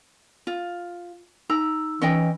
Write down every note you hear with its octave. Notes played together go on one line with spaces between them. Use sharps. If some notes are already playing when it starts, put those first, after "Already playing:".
F4
D#4 A#5 E6
E3 C#4 D#5 G5